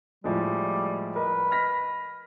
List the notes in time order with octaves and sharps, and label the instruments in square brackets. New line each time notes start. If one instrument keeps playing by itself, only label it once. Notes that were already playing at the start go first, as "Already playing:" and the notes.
[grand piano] A2 F3 G#3 [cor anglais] G3
[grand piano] A#4 D#5 [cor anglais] B4
[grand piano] F6 A#6 B6